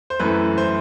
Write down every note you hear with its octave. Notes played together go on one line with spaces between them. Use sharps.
C5
F#2 E3 A3 B4
C5